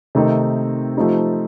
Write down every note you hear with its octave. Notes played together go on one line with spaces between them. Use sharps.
C3 D#3 A3 C4 D#4
F3 A3 C4 D#4 G4